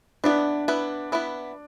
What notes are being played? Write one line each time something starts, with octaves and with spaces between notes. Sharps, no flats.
B3 D4 E4 B4
B3 E4 B4
B3 E4 B4